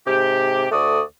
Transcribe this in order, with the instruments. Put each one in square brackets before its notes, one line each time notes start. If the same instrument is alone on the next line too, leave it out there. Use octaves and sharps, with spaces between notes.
[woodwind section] G#2 C3 G4
D2 A3 F#4 D5 D#6